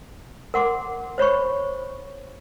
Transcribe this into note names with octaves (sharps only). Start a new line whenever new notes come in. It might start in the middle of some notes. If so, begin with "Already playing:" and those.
A#4 F#5 C6 D6
C5 C#5 B5 C#6